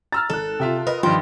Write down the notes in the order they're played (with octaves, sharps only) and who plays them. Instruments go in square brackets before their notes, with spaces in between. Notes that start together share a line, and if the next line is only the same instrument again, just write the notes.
[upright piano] A#5 E6 F6 [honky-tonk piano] A6
[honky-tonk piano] G#1 F#6 [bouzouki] A4
[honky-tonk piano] C3 [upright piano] F4 E5 G5
[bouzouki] A#4 [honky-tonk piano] B4 D#5
[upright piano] G2 D#3 G3 [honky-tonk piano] F3 [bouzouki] G4 [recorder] C6